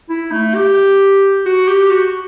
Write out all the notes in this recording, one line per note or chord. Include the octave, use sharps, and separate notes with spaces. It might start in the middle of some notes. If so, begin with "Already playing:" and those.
E4
A3
G4
F#4
G4
F#4